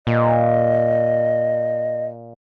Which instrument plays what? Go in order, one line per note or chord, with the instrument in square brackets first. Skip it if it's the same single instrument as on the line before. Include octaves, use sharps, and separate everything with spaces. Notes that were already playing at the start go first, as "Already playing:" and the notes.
[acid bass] A#2 [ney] D#5